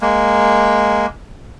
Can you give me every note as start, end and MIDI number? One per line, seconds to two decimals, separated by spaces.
0.01 1.06 56
0.01 1.06 58